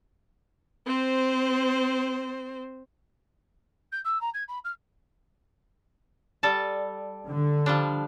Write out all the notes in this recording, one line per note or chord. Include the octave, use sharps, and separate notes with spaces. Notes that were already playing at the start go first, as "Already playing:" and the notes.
C4 C5
G6
E6
A#5
G#6
B5
F6
G3 A4 A5
D3
F3 G3 D4